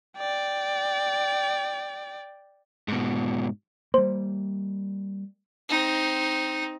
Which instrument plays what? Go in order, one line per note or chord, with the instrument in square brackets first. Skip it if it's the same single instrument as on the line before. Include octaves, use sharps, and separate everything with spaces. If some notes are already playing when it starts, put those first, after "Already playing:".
[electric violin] D5 G5
[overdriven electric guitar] G#2 B2
[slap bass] G3 A#3 [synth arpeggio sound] C5
[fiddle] C4 D#4